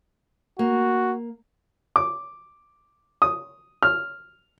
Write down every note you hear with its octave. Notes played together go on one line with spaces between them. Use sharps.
A#3 F#4
D6
D#6
F6